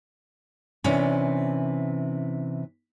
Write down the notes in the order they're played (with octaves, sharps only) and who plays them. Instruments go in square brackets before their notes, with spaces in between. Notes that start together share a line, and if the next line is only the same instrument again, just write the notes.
[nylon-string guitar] C3 E3 C#4 D4